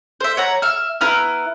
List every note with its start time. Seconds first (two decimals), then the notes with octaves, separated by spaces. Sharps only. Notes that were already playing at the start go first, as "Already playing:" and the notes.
0.20 C5 E5
0.37 C#5 F#5 A#5
0.62 E5 F6
1.01 B3 E4 A#5 F6